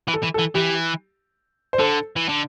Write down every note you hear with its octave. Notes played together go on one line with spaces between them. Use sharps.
E3
A4
E3
A4
E3
E3 G4
C5
D3 A4
E3
D3